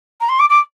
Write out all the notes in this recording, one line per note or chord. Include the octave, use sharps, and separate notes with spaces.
A#5
C6
D6
D6